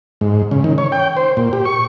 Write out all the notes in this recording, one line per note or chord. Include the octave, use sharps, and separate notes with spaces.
G#2
C#3
D#3
C#5
G5
C5
A#2
G4
C#6